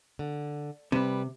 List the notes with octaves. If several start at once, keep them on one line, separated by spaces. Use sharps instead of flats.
D3
C3 G3 B4